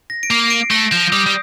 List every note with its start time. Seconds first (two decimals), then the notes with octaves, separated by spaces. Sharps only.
0.10 A#6
0.23 D7
0.31 A#3 C7
0.50 D7
0.71 A3 A#6
0.92 F3 G6
1.12 G3 D#6
1.26 G3